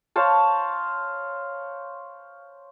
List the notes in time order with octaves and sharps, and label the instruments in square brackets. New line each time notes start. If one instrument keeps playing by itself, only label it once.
[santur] C5 C#5 F5 A5